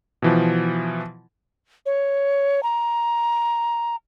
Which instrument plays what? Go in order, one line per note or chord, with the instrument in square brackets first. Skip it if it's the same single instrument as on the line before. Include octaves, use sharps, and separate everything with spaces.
[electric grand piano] B2 E3 F3
[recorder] C#5
A#5